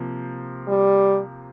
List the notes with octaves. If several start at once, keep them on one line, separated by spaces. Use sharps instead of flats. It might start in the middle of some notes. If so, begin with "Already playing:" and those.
Already playing: C3 F3 A#3
G3